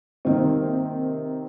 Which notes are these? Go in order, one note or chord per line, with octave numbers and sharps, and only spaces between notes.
C3 D#3 A#3 C4 D#4